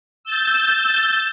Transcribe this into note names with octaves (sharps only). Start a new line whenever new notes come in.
E6 G6 A6